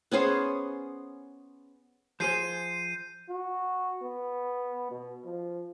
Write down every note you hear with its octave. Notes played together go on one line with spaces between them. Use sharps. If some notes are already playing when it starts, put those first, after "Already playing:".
B3 C#4 G#4 C5
F3 G#4 C5 G6 C7 D#7
F#4
B3
B2
F3